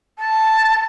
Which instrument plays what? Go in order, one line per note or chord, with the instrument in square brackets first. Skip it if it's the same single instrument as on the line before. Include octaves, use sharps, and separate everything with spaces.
[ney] A5